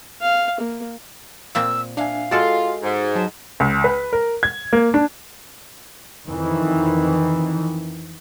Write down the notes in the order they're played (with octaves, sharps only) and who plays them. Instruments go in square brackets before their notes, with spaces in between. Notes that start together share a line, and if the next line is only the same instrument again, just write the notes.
[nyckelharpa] F5
A#3
[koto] A#2 A#3 C4 [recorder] E6
[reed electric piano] D4 E5 G#5 [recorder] F5
[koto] G#3 A4 D5 [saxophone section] F4 [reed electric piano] F#4 D#5 G#5
[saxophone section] G#2
[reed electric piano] F#3 [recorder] A5
[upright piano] C#2
B4
A#4
G#6
A#3
D4
[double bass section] F2 D#3 E3